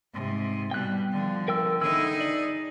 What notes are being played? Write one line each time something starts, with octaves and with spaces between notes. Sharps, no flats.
G#2 C3
B2 G3 G5 F#6
D3 F3
A#4 G5 E6
D3 D#4 E4 G#4 E6
D5